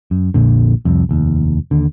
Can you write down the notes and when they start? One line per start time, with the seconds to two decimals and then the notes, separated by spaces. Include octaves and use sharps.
0.11 F#2
0.34 A#1 F2 A#2 D3
0.85 C2 F2
1.09 F1 D#2
1.71 D#2 D3